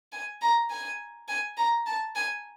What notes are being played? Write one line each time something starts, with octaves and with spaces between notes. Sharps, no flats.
G#5
A#5
G#5
G#5
A#5
A5
G#5